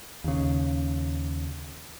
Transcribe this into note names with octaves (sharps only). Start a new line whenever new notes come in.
D#2 C#3